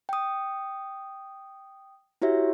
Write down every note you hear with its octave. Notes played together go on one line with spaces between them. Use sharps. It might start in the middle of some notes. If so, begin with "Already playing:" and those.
G5 D#6
E4 F#4 G4 C#5 E5